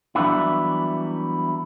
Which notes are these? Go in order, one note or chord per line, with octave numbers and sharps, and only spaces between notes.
E3 F#3 G3 B3 D4 E4